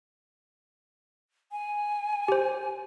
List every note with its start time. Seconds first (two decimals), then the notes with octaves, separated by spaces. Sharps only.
1.52 G#5
2.28 G4 C5